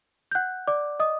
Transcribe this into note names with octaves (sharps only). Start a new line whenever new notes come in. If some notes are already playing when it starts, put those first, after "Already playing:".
G6
F#5 F#6
D5 D6
D#5 D#6